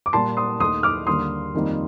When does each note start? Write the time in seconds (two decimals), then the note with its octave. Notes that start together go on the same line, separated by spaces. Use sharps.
0.06 D6
0.13 A#2 G3 A#3 A5 C6
0.37 C6 D#6
0.60 D#2 D#3 A3 C6 D#6
0.83 D6 F6
1.07 D#2 D3 G3 A#3 C6 D#6
1.54 F2 D#3 G3 A#3